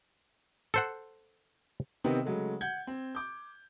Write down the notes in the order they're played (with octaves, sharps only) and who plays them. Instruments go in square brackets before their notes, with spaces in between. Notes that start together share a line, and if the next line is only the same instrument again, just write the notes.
[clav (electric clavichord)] A4 C5 F#5
[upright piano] C3 D#3 B3 C4 D#4
C#3 F#3 G#3 A3
F#5 G6 G#6
C4
D6 G6